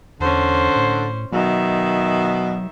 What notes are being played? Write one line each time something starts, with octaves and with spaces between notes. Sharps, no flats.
E2 D3 C#4 C5
A2
B2 D#3 F#3 E5